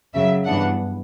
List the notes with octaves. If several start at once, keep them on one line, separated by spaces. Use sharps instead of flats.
F#2 C#3 F#3 E5
G2 E3 B3 D4 F#5